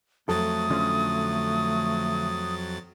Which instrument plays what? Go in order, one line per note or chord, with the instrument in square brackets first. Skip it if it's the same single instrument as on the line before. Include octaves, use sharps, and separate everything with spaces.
[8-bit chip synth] F2 F#3 A6 [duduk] A3 [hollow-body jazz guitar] A4 [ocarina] D#6
[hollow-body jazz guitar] D3 F3 C#4